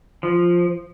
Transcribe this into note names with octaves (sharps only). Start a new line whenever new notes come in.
F3